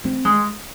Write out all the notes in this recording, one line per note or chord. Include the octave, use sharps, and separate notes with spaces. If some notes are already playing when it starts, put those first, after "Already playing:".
C4
G#3